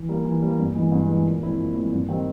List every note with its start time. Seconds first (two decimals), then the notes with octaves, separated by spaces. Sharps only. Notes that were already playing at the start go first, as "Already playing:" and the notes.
Already playing: E3
0.09 G3 A#3
0.25 E3
0.42 G3 A#3
0.59 G2
0.75 E3 G#3 B3
0.92 G2
1.09 E3 G#3 B3
1.25 A#2
1.42 F3 G#3 C4 E4
1.58 A#2
1.75 F3 G#3 C4 E4
1.92 G2
2.08 D#3 G3 C4